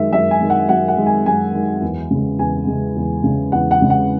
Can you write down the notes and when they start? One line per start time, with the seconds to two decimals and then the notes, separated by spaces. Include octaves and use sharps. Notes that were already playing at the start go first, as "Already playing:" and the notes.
Already playing: F#2 D#3 G#3 E5
0.12 F#2 E5
0.31 G#5
0.41 D#3 G#3
0.50 F#5
0.69 F#2 F#5
0.88 F#5
0.97 D#3 G#3
1.06 G#5
1.26 F#2 G#5
1.54 D#3 G#3
1.82 E2
2.11 C#3 G#3
2.39 E2 G#5
2.67 C#3 G#3
2.96 E2
3.24 C#3 G#3
3.52 E2 F#5
3.71 F#5
3.81 C#3 G#3
3.90 F#5